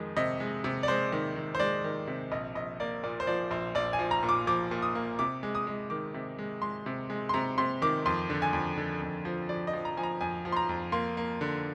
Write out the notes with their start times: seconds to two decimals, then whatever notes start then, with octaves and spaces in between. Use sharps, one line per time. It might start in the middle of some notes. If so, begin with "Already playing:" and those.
Already playing: F2 D#3 G#3
0.17 C3 D#5
0.40 G#3
0.64 C3
0.83 D5
0.88 G#3 C5
1.12 D#3
1.36 D#3
1.55 C5
1.60 G#3 D5
1.84 D#3
2.08 C3
2.32 A#1 D#5
2.55 A#1 D#5
2.80 A#3 D5
3.03 A#2 D5
3.20 C5
3.27 F3 D5
3.51 A#1 C5
3.75 A#1 D5
3.93 G#5
3.99 F3
4.11 A#5
4.23 A#2
4.29 D6
4.47 F3 D6
4.71 A#2
4.82 D#6
4.95 A#3
5.19 C3 D6
5.43 G#3
5.55 D#6
5.67 G#3
5.90 D#3 D6
6.14 C3
6.39 G#3
6.62 G#3 C6
6.86 C3
7.10 G#3
7.29 C6
7.34 C3 A#5
7.58 C3 C6
7.82 D#3 D6
8.06 F2 C6
8.30 D3
8.42 G#5
8.53 F2
8.78 D3
9.02 F2
9.25 F3
9.49 F3 D5
9.67 D#5
9.73 F3
9.85 A#5
9.97 F3 G#5
10.03 A#5
10.21 F2 G#5
10.45 F3
10.52 C6
10.57 A#5
10.69 F2
10.92 A#3 C6
11.17 A#3
11.41 D3